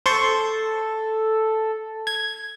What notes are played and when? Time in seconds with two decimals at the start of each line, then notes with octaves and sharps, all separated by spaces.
0.06 A4 C5 C6 C#6
2.07 G#6